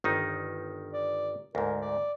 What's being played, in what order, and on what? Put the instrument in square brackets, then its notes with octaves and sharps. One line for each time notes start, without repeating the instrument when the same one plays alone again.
[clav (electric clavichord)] G1 D#3 D#4
[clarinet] D5
[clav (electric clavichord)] D2 G#2 [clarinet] A#4
[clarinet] D5